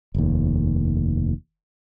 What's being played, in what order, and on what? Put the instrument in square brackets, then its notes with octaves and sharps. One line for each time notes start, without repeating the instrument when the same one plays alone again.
[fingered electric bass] F1 D#2